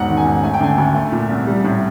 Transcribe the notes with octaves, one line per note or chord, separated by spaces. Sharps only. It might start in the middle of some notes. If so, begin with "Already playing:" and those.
Already playing: E1 G#2 F#5
D#3
G#5
G#2
A3 G#5
G5
D3 G#5
D2
A3
A#2
C2
G3
A2